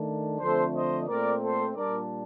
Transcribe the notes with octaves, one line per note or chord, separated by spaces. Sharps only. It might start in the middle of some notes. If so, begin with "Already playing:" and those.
Already playing: D#3 A3 D4
D3 F3 A3 C4 A4 C5
C5 D#5
A#2 A3 C4 A#4 D5
A4 C5
A#2 G3 D4 A#4 D5